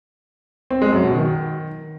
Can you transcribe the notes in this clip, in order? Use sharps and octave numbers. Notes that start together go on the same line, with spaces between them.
C4
G#3
F#2
B2
D#3